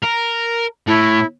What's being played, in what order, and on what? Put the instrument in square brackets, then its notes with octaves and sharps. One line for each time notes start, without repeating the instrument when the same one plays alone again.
[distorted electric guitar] A#4
[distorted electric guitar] A2 [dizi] E4